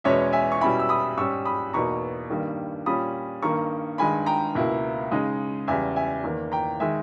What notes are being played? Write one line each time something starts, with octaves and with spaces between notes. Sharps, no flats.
E2 B2 G#3 C#4 C#5 E5
E5 G#5
C#6
B2 G3 C#4 E4 G#5 B5
E6
B5 D#6
G#2 G3 C#4 C#6 E6
B5 D#6
E2 B2 A#3 D#4 A#5 C#6
G2 D#3 G3 A#3
A#2 G3 C#4 B5 D#6
G2 D#3 A#3 A#5 C#6
G2 D#3 G#3 G#5 B5
G5 A#5
C#2 B2 A#3 E4
C#3 G#3 D#4
E2 C#3 G3 E5 G#5
E5 G#5
E2 D#3 A#3
G5 A#5
D#3 G#3 E5 G#5